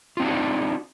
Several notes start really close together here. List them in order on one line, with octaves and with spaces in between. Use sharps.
F4 C4 D#4 D4 F#4